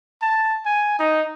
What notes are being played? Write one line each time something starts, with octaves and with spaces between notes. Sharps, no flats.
A5
G#5
D#4